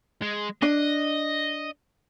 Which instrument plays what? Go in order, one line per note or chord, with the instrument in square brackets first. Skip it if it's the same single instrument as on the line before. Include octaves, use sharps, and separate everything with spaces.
[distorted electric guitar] G#3
[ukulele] D4 [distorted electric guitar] D#5